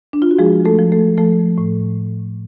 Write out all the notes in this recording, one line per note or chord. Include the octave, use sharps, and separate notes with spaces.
D4
F4
F#4
F3 G#3 G#4
A3 A4
F3
A3 A4
F3 A3 A4
A2